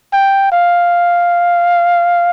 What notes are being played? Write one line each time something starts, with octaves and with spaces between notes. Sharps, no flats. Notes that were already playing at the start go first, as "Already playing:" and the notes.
G5
F5